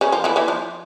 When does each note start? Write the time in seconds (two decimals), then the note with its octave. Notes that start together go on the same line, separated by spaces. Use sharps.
0.01 C#3 C#4
0.12 F3 F4
0.24 E3 E4
0.36 E3 E4
0.48 F3 F4